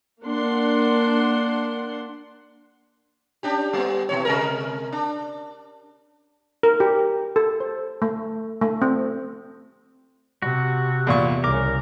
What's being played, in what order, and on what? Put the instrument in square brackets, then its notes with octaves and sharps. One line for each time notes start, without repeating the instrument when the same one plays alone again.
[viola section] A#3 D4 F#5 C6
[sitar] C#4 D4 G4
G3 B3
B2 E3 C#5
C3 G#3 A#4
D4
[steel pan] A#4
G4
A4
C5
A3
A3
C4
[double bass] C3 [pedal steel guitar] F#4
[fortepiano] E2 A#2 C#6
[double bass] C2 C#3 [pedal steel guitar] A#4 [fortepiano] D6